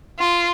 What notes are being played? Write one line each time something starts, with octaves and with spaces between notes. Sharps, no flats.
F4